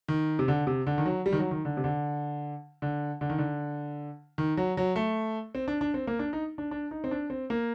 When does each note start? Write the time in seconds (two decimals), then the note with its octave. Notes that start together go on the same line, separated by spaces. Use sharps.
0.08 D#3
0.39 C3
0.48 D3
0.67 C3
0.87 D3
0.98 D#3
1.06 F#3
1.26 G3
1.32 D#3
1.39 F#3
1.51 D#3
1.65 D3
1.77 C3
1.84 D3
2.82 D3
3.21 D3
3.30 D#3
3.39 D3
4.38 D#3
4.57 F#3
4.77 F#3
4.96 A3
5.55 C4
5.68 D4
5.81 D4
5.94 C4
6.07 A#3
6.19 D4
6.33 D#4
6.58 D4
6.71 D4
6.91 D#4
7.04 C4
7.11 D4
7.30 C4
7.50 A#3